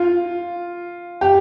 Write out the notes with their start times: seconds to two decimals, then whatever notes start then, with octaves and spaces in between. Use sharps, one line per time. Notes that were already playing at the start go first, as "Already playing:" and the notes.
Already playing: F4
1.21 G4